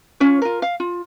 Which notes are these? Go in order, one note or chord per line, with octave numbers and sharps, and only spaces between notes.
C#4 F4 C#5
F4 A#4
F5
F4